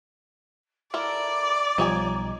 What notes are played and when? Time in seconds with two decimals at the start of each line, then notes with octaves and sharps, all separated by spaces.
0.94 E4 A4 A#4 D5 D6
1.78 B1 F3 G3 D#4 C#5 G#5